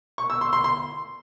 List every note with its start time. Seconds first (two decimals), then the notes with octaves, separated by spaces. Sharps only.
0.18 C#6
0.30 E6
0.41 C6
0.53 C6
0.64 C6